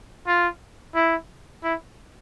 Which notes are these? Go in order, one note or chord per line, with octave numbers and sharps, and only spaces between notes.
F4
E4
E4